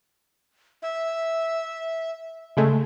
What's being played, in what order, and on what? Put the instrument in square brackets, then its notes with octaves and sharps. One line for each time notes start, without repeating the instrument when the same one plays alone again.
[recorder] E5
[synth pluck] C#3 G#3 A3